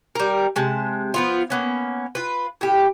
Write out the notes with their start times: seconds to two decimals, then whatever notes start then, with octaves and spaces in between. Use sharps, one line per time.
0.15 G3 A#4
0.56 C3 G#3 A5
1.14 F3 B3 F4
1.50 A#3 B3 C#4
2.15 F4 B4
2.61 A2 G4